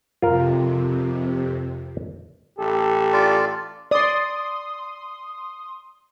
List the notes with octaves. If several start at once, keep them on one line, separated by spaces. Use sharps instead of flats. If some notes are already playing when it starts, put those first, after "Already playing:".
F2 C3 F4 A#4
A1 G4 A4
F4 D5
D5 C6 D#6